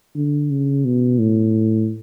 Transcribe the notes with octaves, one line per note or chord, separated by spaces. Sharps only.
D3
C#3
B2
A2